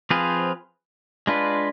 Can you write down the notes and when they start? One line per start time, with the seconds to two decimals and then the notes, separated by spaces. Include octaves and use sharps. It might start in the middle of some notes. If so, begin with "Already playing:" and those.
0.11 F3 C4 F4 G#4 B4
1.27 G#3 D4 F4 B4